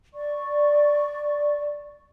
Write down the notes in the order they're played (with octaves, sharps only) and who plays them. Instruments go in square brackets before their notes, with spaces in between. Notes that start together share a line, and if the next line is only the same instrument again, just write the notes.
[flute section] D5 C#6